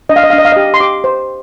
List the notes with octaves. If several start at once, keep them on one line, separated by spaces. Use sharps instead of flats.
D4 D#5
F5
D#5
F5
D4
D#5
F5
G4 D#5
C6
G4 D6
C5